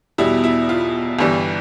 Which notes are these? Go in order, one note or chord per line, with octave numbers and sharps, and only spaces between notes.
E2 B2 G3 E4
E4
F4
G1 G2 E3 G3